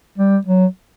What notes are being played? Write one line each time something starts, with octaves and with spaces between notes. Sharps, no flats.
G3
F#3